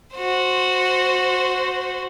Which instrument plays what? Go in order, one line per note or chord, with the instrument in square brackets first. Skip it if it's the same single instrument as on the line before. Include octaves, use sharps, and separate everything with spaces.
[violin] F#4 C5